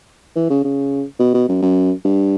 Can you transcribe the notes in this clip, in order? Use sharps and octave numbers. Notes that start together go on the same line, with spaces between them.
E3
C#3
C#3
B2
B2
F#2
F#2
G2